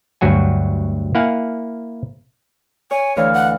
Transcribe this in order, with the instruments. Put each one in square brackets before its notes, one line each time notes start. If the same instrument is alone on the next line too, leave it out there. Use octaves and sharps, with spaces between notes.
[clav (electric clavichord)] D2 G2 F#3 F#4 G#5
A#3 E4 F5 F#5 G#5
[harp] C#5 [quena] G#5
[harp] D2 E3 F5 [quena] C#5
[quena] F#5